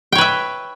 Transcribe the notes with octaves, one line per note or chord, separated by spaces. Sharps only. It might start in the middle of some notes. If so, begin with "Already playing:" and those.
B4 C#5 E5 G5